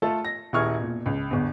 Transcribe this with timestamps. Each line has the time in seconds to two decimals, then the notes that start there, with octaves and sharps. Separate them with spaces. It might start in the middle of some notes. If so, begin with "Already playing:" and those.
0.02 A3 F4 A4
0.25 A#6
0.53 D#1 E4 G#4 C#6 F6 G#6
0.78 E1 A#2
1.06 C#2
1.31 G1 E2